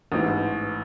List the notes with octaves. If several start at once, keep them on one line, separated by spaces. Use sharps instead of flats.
A1 G#2 E3